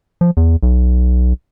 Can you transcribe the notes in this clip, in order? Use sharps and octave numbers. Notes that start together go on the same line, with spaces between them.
F3
E2
B1